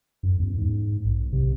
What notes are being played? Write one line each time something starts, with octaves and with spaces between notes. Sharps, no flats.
F#2
E2
G#2
B1
C3